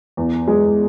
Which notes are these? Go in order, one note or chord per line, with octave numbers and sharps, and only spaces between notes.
E2
G#3